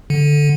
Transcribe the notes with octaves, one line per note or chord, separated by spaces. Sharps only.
D3